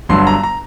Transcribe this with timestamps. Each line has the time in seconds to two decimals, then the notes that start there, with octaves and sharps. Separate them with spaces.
0.09 G1 G2 D3 F#3 C6
0.27 A#5
0.43 A#5